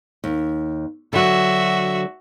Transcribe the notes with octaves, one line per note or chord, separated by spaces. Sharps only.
D#2
D3 F#3 F#4 E5